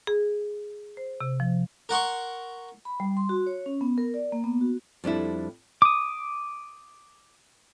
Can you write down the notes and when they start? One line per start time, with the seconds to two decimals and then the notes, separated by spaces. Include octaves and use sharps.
0.07 G#4
0.97 C5
1.21 C3
1.40 F3
1.89 A#4 F#5 C6 C#6
2.85 B5
3.00 G3
3.17 C6
3.29 F#4
3.47 C#5
3.66 C#4
3.81 B3
3.98 A#4
4.14 D5
4.32 A#3
4.44 B3
4.61 F#4
5.04 F2 G3 D4 E4
5.82 D6 D#6